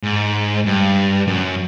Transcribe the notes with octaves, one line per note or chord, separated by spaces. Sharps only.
G#2
G2
F#2